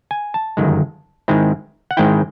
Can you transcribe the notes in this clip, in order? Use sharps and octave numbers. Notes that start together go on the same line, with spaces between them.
G#5
A5
G1 F#2 D#3 G#3
G#2 D#3 G#3 C4 E4
F#5
G#2 D#3 G#3 C4 E4 G5